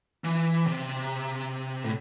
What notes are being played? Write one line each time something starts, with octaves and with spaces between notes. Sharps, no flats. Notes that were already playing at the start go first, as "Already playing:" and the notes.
E3
C3
A2